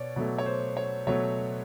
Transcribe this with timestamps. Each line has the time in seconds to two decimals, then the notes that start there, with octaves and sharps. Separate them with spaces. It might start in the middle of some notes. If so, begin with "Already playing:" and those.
Already playing: B2 C#5 D5
0.16 B2 F#3 A3
0.38 C#5
0.46 C5
0.77 C#5
1.07 B2 F#3 A3 C#5